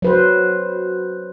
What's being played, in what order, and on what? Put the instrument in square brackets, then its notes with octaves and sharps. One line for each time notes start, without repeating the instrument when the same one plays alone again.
[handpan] F#3 B4 C5